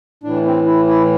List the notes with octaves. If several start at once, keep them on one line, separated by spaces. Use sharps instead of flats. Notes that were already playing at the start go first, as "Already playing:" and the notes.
A2 E3 D4
C4
E4
E4